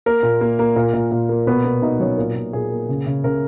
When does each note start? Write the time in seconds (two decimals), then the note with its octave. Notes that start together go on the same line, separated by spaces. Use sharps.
0.06 A#3 A#4
0.23 A#2
0.41 A#3
0.59 A#3
0.76 A#2 A#4
0.94 A#2
1.12 A#2
1.29 A#3
1.47 B2 B3 B4
1.65 B2
1.82 B2 D#4 D#5
2.00 F#3 C#4 C#5
2.17 A#2 A#4
2.35 A#2
2.53 A#2 G#4
2.71 A#3
2.89 C#3
3.06 C#3
3.24 C#3 A#4